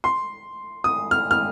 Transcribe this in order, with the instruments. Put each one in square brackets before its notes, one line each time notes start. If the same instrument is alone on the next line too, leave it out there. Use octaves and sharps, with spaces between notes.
[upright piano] C6
D#6
F6
F6